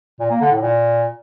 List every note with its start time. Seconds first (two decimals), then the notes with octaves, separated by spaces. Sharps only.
0.20 A#2
0.31 A#3
0.41 D3
0.51 A2
0.62 A#2